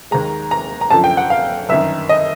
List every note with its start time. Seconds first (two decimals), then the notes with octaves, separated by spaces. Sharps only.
0.11 D#2 D#3 G#3 A#5
0.51 A#5
0.81 A#5
0.91 F#2 D3 F3 A5
1.04 G5
1.17 F#5
1.30 F5
1.69 G1 F#2 D#3 E5
2.09 D#5